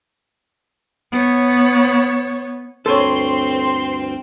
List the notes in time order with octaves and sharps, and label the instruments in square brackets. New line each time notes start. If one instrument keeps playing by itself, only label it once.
[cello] B3 C#5
[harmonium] D2 G2 [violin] C4 [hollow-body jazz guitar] A4 B4 C#5 [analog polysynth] C6